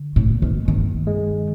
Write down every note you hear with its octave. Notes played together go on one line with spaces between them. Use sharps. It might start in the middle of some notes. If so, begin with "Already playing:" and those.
Already playing: D3
A2
A#3
D#3
G2 D#3
G#3